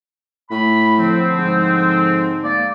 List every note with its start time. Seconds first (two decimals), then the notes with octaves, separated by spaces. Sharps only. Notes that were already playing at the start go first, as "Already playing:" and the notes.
0.51 A2 B5
0.99 D3 F3 C4
1.39 G#2
2.44 A#3 D5